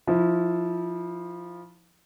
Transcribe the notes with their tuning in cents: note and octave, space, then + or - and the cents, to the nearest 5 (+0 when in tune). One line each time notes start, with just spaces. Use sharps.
F3 +0 E4 -25